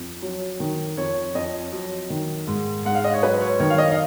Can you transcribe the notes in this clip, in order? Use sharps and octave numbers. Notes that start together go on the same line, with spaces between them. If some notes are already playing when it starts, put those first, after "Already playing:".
Already playing: F2
F#3
D#3
F2 C#5
F2 D#5
F#3
D#3
G#2
G#2 F#5
F5
D#5
C#5
F#3 B4
C#5
D#3 C#5
F5
D#5
F5